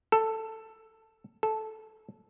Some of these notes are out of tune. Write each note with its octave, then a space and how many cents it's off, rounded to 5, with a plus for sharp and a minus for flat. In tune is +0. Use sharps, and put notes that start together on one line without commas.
A4 +10
A4 -10